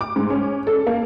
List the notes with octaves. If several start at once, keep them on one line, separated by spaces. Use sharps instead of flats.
D6
G#2
C#4
A4
A#3